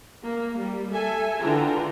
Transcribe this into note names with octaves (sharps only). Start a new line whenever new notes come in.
A#3
G3
A4 E5 G#5
D3 E3 F4 G5 A#5